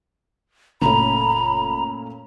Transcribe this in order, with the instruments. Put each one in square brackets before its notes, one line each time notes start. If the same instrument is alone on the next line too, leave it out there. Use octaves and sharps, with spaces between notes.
[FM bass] F#1 [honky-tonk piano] A#2 A3 C#4 [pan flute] A#5 [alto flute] B5